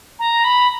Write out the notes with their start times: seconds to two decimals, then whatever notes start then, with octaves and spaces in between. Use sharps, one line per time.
0.19 A#5
0.44 B5